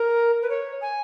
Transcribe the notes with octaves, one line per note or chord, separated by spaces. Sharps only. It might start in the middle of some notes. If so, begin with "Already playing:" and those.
Already playing: A#4
B4
C#5
G#5